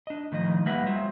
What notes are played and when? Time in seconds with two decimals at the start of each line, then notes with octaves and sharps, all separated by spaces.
0.07 D4 D#5
0.32 A2 D#3 F3 D#5
0.66 G3 A#3 B4 D#5 E5 F#5
0.86 F#3 G#3 C4 F4 C5 E5